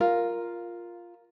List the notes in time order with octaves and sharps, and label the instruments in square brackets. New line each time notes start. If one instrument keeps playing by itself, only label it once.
[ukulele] F4 [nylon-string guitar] A#4